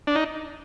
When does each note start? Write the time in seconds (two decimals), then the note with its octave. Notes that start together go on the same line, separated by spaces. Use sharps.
0.07 D4
0.15 D#4